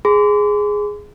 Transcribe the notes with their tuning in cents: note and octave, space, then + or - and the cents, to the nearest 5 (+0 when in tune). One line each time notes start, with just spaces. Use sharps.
G#4 +0 C6 -40